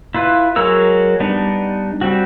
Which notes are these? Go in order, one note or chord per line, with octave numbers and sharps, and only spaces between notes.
E4 F4 B4
F#3 G#3 F#4 A#4 E6
G3 B3 D4 D#4
G3 C4 F#4